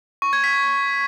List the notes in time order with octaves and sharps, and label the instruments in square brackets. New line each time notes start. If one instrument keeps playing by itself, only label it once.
[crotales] C#6
G#6
B6